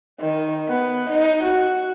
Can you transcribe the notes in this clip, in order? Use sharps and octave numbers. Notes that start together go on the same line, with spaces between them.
D#3
B3
D#4
F#4